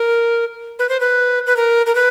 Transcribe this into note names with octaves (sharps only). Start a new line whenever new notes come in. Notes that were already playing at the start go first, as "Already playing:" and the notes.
Already playing: A#4
B4
C5
B4
B4
A#4
A#4
B4